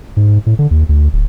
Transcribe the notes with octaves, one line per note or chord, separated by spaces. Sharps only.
G#2
A2
D3
D#2
D2
D1